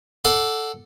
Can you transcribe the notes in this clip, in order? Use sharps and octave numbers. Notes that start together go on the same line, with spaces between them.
A4 D5 F#5 C6